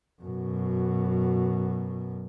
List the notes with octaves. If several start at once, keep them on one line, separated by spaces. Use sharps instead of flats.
F#2 B2